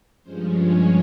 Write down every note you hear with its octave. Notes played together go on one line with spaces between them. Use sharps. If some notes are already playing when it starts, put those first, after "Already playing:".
G2 F3 G#3 C#4 C5
C#5